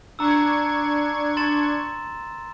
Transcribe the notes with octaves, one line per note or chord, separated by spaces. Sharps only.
D4 A#5 C#6 E6 G#6
C6 A6 E7